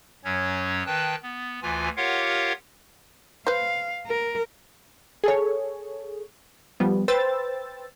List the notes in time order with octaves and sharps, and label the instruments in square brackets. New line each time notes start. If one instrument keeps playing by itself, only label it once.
[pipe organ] F#2 F#3 C#4 C#5
D#3 B4 G5 A5 F#6
B3
D2 E3 F4 G#5
F4 G4 A#4 C#5 F5 F#5
[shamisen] B4 C5 [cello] F5
[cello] A#4
[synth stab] G#4 A4 C#5
F3 G3 B3
B4 C5 G5 E6 A6